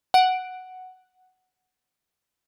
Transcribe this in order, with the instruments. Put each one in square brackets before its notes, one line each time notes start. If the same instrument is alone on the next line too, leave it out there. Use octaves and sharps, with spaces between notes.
[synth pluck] F#5 D7